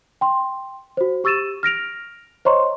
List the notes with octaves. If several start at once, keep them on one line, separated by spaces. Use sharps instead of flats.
G5 C6
F#4 C5
G4 C#6 E6 A6 D#7 E7
F6 A#6 D7 F7
C5 C#5 D#5 A#5 C6 C#6